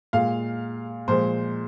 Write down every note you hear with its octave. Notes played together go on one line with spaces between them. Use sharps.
A#2 G#3 F5
A#2 F3 G#3 C5